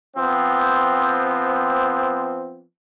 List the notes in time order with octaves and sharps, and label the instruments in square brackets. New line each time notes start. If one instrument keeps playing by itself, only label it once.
[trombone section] F3 B3 C4